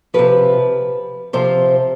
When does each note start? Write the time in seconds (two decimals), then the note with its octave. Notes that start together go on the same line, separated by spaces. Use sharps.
0.14 C3 F3 B4
1.33 C3 F3 C5